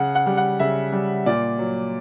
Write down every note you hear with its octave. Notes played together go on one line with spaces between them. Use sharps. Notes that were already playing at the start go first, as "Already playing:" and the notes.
Already playing: C#3 F#5
F#5
G3
F#5
C#3 E5
G3
A#2 D5
F#3